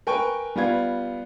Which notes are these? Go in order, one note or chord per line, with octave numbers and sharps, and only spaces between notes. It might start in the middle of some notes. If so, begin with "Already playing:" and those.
A#4 B4 G5 G#5 C#6
G3 B3 F4 G#6